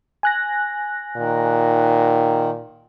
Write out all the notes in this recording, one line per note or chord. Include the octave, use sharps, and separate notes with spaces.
G#5 F#6 A#6
A#2 D#3